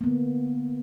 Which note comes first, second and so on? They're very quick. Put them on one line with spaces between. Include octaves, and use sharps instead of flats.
A#3 B3 D3